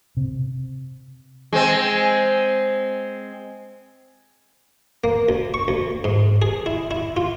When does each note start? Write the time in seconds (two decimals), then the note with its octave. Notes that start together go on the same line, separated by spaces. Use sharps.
0.17 C3
1.53 G#3 C4
5.04 A#3
5.29 D2
5.54 C#6
5.68 D2
6.04 G#2
6.42 G#4
6.66 E4
6.91 E4
7.17 F4